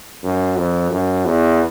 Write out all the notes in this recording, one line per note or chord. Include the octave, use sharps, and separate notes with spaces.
F#2
F2
F#2
E2